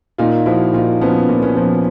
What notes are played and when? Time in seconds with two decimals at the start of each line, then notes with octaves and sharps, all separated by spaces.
0.18 A#2 D#4 F4
0.46 F3 E4 F#4
0.73 A#2 D#4 F4
1.01 F3 B3 C#4
1.29 A#2
1.43 B3 C#4
1.57 F3